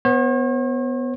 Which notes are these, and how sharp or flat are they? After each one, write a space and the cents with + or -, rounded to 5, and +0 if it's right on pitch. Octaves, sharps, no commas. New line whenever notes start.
B3 +5 C#5 -45